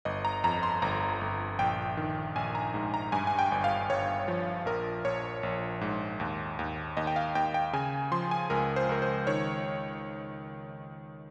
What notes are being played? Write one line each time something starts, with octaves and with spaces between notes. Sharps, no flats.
G1 D#5
A#5
F2 A#5
C6
G1 A#5
G1
A#1 G5
D#3
A#1 G#5
A#5
G#2
A#5
G2 G#5
G#5
G5
G1
F5
G1 C#5
F3
A#1 A#4
A#1 C#5
A#1
G#2
D#2
D#2
D#2 D#5
G5
F5
D#2 G5
G5
C#3 G#5
F3 C6
G#5
C#2 A#4
C5
C#2 A#4
C5
D#3 C#5